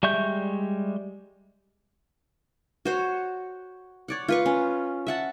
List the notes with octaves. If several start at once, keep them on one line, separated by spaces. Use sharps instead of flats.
G3 G#3 E5 C#6 G6
F#4 C5 C#5
C#5 D5 F#5
F4 B4 C#6
C#4
E5 F#5 A5